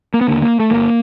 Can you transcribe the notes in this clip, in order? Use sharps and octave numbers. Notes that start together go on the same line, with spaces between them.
A#3
B3
D#2 D3 A#3
A#3
A3
G1 A#3